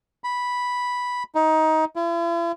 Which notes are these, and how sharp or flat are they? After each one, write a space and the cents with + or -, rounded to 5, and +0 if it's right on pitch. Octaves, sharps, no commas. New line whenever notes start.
B5 -5
D#4 +20
E4 +45